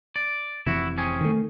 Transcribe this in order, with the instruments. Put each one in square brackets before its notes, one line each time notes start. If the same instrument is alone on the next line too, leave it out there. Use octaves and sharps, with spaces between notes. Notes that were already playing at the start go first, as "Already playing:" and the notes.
[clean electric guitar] D5
[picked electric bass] F1 C3 E3 [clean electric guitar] E4 F#4
[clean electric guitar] C4 C#4 G#4
[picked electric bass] D#3 A3